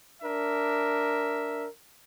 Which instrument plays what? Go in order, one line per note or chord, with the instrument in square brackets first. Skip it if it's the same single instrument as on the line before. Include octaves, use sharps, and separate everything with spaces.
[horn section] D4 A#4 E5